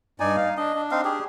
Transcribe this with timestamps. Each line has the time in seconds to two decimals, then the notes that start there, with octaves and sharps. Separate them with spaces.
0.20 G2 D#4 D5 G#5
0.36 F5
0.57 D4 D#5
0.75 D4
0.91 C4 D#4 F5
1.05 G4 G#4